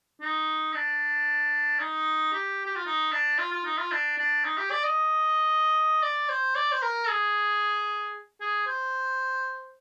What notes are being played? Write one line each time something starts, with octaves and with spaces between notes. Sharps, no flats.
D#4
D4
D#4
G4
G4
F4
D#4
D4
F4
F4
D#4
F4
D4
D4
D#4
G4
D5
D#5
D5
C5
D5
C5
A#4
G#4
G#4
C5